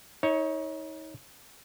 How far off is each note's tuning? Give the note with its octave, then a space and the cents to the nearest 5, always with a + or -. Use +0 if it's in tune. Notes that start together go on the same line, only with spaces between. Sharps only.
D#4 +30 C#5 +0